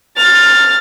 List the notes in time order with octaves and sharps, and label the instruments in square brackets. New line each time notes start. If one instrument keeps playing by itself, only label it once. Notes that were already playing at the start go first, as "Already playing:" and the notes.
[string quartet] F6 A6